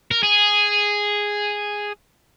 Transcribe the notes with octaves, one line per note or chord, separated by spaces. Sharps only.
A#4
G#4